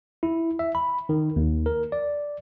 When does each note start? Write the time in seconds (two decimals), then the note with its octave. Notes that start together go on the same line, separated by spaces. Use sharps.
0.23 E4
0.59 E5
0.75 B5
1.09 D#3
1.36 D#2
1.66 A#4
1.92 D5